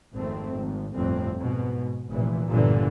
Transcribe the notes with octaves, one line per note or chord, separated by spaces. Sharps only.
G#1 F2 A3 C4
G#1
G1 F2 A2 C4
G#2 B2
F1 A#2 E3
G1 A#2 D3 E3